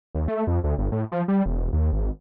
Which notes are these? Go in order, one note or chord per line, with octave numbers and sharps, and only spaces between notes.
D#2
A3
F2
D2
G1
A2
F3
G3
E1
D#2
G#1